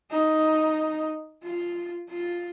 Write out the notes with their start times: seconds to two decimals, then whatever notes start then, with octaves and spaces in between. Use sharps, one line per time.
0.11 D#4
1.43 F4
2.09 F4